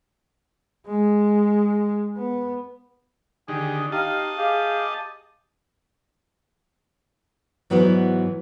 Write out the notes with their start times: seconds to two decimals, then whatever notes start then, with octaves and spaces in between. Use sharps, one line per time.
0.86 G#3
2.18 B3
3.48 D3 D#3 G4 G#4
3.92 D#4 G4 D#5 F5 A5
4.38 G4 G#4 F5
7.70 G#2 E3 F#3 G#3 B3